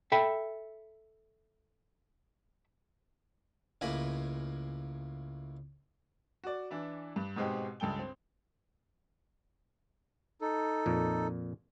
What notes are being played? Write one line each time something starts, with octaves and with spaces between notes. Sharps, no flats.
A4 E5 G5 B5
C#2 A2 A#3 G#5 A#5 B5
F#4 D5
E3 D4 E4
G2
G#2 B2 G#3 C4 G4
C#2 G2 A4 G5 G7
C4
D#4 A4
F2 A#2